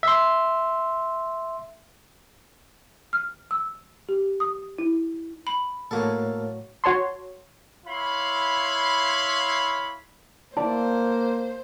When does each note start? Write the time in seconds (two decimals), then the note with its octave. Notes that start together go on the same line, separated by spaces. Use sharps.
0.03 E5 C6
3.13 F6
3.51 E6
4.09 G4
4.40 D#6
4.79 E4
5.47 B5
5.91 A2 A#3 F#4 A4 C#5
6.84 F#4 C#5 A5 C6
7.86 E4 C#5 F5 B5 C6
10.57 A#3 E4 C5 D5 A5